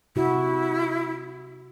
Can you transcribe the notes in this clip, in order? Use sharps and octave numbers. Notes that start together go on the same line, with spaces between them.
C3 E4 F#4